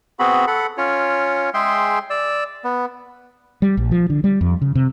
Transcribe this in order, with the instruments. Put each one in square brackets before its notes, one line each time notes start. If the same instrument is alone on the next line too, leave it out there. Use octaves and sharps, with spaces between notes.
[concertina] B3 C4 F#4 G#4 B5
A4 F#5 B5
C#4 F4 C#5
G#3 G#4 E5 G5 C6
D5 E6
B3
[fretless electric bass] G3
A#1
F3
D3
G3
F2
C#3
C3